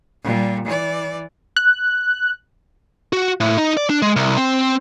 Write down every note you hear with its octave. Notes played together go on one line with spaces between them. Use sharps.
A#2 G3
E3 D5
F#6
F#4
A2
D#4
D5
D4
G#3
C2
C4